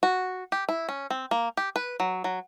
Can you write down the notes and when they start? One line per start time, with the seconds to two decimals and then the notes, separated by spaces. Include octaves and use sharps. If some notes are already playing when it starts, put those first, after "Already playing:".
0.03 F#4
0.52 G4
0.69 E4
0.89 C#4
1.10 C4
1.31 A#3
1.57 G4
1.76 B4
2.00 F#3
2.24 F#3